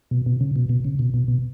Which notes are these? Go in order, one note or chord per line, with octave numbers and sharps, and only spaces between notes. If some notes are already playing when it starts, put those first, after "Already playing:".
B2
B2
C#3
B2
B2
C#3
B2
B2
B2